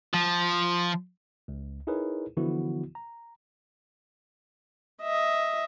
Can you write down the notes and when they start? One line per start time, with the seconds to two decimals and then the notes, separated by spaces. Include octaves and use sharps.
0.14 F3
1.48 C#2
1.87 D#4 E4 G#4 A#4 B4 C#5
2.37 D3 E3 F3 B3 E4 F#4
2.95 A#5
5.02 D#5 E5